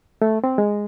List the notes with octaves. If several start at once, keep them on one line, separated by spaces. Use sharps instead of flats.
A3
C4
G#3